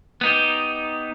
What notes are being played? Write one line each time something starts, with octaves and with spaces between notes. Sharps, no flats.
B3 D#4 G4